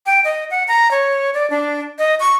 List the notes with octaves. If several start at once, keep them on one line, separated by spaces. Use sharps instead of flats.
G5
D#5
F#5
A#5
C#5
D5
D4
D#5
C#6